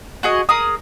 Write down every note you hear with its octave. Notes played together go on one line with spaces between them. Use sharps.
F#4 G#4 D#5
G#4 A#4 D#6